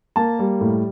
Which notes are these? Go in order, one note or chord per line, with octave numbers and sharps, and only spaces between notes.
A#3 A5
G3
A2